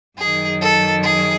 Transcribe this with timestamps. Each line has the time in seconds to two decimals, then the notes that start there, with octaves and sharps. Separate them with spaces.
0.18 F#2 D#3 G#4
0.61 A4
1.04 G#4